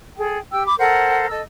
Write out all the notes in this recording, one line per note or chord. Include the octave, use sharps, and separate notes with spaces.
G#4 A4 G5
G4 G5 E6
B5 D6
A4 A#4 C5 F#5
A4 D#5 E6